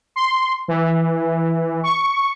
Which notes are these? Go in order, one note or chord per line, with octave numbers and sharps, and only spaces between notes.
C6
E3
C#6